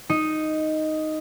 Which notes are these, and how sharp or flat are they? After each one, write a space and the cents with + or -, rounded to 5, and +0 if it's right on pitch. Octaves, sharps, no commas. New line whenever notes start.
D#4 +0